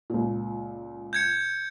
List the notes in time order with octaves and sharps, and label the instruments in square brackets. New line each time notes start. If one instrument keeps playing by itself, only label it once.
[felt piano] C#2 A#2
[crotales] G6 G#6 C#7